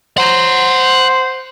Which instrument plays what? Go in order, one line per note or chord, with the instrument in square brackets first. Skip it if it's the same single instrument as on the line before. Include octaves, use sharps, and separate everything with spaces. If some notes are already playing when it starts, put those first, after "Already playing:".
[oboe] C5 [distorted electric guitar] F#5 A#5